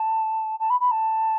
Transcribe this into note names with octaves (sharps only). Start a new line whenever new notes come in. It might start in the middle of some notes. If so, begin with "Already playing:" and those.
Already playing: A5
A5
B5
B5
A5